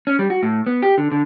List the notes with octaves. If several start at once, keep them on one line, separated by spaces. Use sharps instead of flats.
C#4
G3
F#4
A2
B3
G4
D3
D3